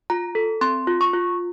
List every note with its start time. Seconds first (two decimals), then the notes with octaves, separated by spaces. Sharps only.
0.10 F4 A#5
0.35 A4
0.61 C4 C6
0.87 F4
1.01 C#6
1.13 F4